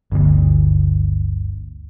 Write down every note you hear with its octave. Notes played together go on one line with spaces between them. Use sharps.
G1 D2